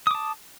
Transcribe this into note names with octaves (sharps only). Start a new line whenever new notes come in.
A5 D6 D#6